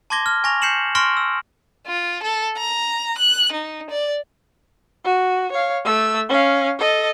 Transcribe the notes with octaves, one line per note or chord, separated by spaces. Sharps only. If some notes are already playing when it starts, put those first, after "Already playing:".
A5 C6 D6 G#6 A#6 G7
F6
G#5 C#6 A#6 F7
G6 C7 C#7 E7 F#7
C6 C#6 F6 A#6 D7 F#7
E6
F4
A4
A#5
F#6
D#4
D5
F#4
C#5 F5
A3 E6
C#4 F5
A4 D#5